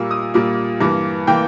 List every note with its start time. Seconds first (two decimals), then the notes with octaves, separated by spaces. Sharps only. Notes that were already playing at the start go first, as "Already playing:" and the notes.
Already playing: A#2 G3 A#3 E6
0.11 D#6
0.34 A#2 G3 A#3
0.81 G2 E3 A#3
1.27 E3 A#3 G5